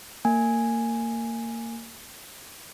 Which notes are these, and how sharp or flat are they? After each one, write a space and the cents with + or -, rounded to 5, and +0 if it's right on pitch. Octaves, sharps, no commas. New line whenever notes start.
A#3 -25 G#5 +0